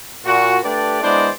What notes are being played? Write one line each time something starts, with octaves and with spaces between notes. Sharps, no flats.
A#2 F#4
A3 D4 G4 B4 D5
G#3 B3 D4 E4 C5 D5